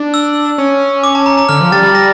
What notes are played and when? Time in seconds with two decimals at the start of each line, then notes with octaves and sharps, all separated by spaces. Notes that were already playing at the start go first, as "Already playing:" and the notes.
Already playing: D4
0.14 E6
0.58 C#4
1.04 D6
1.15 A5
1.26 A#5
1.38 A#5
1.49 D3 F6
1.61 F3
1.72 G3 A6
1.83 G3
1.94 G3 A#6